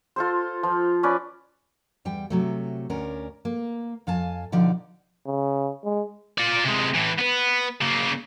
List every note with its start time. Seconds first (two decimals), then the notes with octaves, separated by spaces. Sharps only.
0.16 F4 A4 C5
0.63 F3
1.03 C#4 B4 D5
2.05 E2 G3 G5
2.30 C3 F#3 A3
2.90 D2 C#4 D4 A#4
3.45 A#3
4.07 F2 F5 G#5 A5
4.52 B2 D3 F3 D#4 D5
5.27 C#3
5.84 G#3
6.38 F4 D5
6.65 C3 G#3
6.95 A2 E3
7.19 B3 B4
7.81 C#3 A#3